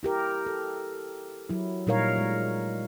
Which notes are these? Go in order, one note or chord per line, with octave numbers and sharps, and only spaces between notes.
E4 G4 A#4
A4
F#3 E4
A#2 G3 D#4 A#4 C#5 F5
G#3